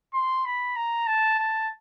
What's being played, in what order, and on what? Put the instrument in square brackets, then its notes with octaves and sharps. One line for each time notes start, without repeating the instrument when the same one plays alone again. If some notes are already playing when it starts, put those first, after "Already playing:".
[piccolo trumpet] C6
B5
A#5
A5
A5